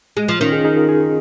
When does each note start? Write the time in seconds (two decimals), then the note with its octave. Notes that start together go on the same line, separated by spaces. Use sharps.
0.17 G#3
0.28 F3
0.40 D#3 C#4 F4
0.52 D#4 G#4
0.64 D#4 G#4
0.77 F4 A#4
0.88 D#4 G#4